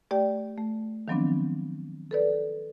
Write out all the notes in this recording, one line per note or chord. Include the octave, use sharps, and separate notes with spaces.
A3 G4 D5 G5
A3
D#3 F3 F#3 B3 C4 D4
A4 B4 D5